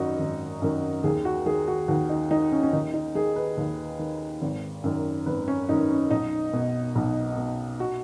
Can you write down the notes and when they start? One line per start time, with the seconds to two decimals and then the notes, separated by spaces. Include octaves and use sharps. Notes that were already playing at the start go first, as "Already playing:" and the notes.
Already playing: G#1 F#2 D#3 D#4 F#4
0.19 G#1
0.62 F#2 D#3
1.04 D#2 G#4
1.25 F#4
1.46 D#3 G#4
1.68 F#4
1.88 D#2 F#4
2.09 D#4
2.31 D#3 D#4
2.52 C#4
2.63 C#4
2.73 D#2 D#4
2.94 D#4
3.15 D#3 G#4
3.36 B4
3.57 D#2
3.99 D#3
4.42 G#1
4.84 F#2 D#3
5.26 G#1 B4
5.48 C#4
5.69 F#2 D#3 D#4
5.90 C#4
6.11 B1 D#4
6.53 B2
6.95 B1
7.37 B2
7.80 F#4